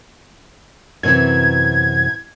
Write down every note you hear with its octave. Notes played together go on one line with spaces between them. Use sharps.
F#2 C3 E3 G#6